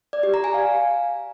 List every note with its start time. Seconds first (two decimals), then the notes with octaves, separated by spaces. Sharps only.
0.13 D5
0.23 G4
0.34 A#5
0.44 G#5
0.54 F5